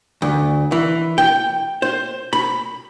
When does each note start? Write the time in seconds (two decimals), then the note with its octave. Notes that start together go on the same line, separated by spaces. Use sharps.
0.22 D2
0.72 E3
1.18 G5
1.82 C5
2.33 B5